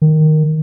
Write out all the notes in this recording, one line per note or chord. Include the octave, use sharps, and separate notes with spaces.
D#3